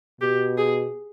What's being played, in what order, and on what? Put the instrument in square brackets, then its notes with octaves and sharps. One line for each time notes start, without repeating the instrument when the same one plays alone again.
[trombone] B2 [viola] G4
[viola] G#4